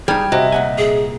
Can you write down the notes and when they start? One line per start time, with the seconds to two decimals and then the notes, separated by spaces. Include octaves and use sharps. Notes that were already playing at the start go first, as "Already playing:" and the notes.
0.08 G3 D#4 G#4 G5 F6 G#6
0.32 C3 F#4 D#5 E5
0.52 A#2 F#5 G#5
0.78 G#4